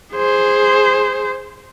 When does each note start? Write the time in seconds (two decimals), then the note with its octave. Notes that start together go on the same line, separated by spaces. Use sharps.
0.14 G#4 C5